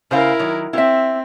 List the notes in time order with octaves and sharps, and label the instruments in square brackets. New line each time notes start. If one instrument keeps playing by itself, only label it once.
[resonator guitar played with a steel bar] C#3 C5 F5 [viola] E4 A#4
[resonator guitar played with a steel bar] D#3 F#3
[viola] C4 [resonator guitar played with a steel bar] E4 E5